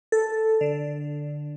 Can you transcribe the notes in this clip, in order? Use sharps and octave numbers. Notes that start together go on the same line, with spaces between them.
A4
D3